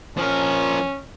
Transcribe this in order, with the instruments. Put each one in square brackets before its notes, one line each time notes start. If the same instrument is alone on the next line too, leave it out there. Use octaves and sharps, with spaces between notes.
[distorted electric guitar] F3 A#4 [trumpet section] C#4